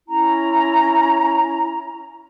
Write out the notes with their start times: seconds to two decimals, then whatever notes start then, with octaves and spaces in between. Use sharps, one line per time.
0.08 C#4 E4 A#5